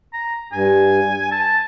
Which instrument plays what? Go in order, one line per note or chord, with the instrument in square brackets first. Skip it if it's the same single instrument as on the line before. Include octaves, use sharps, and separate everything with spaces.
[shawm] A#5
[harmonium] G2 [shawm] G#5
[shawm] A5